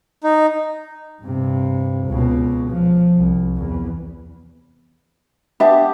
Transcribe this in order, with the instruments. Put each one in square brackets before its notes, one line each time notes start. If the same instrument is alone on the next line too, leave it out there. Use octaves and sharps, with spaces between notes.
[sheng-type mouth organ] D#4
[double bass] G2 C3
C#2 B2
F3
C2
E2
[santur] B3 G4 A5 [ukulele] D4 E5